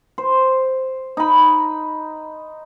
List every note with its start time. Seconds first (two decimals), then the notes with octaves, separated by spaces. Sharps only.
0.18 C5
1.17 D#4 B5